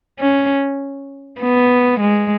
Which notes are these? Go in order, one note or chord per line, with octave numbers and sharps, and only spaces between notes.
C#4
B3
G#3